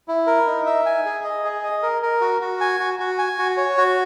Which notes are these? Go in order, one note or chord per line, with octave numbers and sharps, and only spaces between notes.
E4
A#4
D#4
E5
G#5
G#4
D#5
G#4
D#5
A#4
A#4
F#4
F#4
G#5
F#4
F#4
G#5
F#4
C#5
F#4